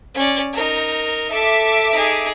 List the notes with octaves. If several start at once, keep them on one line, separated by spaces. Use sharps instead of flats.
C#4 D5
D#4 A#4
A4 E5 D6 B6
D#4 G#4